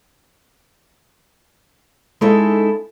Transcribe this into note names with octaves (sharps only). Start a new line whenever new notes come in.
G#3 C#4 D#4 E4 A4